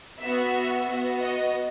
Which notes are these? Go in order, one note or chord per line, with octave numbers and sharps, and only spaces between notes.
B3 F#4 E5
B3 F#4
D#5